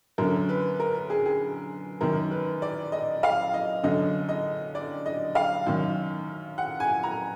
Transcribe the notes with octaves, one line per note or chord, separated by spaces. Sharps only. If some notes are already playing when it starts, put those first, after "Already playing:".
F#2 D3 A#4
B4
A#4
G#4
G#4
F#2 D#3 A#4
B4
D5
D#5
F5
D#5
F#2 D3 D#5
D#5
D5
D#5
F5
F#2 D#3
F#5
G#5
A#5